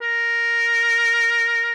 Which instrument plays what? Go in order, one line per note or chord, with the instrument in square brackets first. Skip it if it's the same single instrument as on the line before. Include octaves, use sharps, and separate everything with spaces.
[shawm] A#4